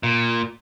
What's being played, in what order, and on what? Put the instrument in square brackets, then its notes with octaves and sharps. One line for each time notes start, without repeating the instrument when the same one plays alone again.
[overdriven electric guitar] A#2